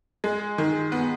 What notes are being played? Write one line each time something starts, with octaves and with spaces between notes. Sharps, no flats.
G#3
D#3
B3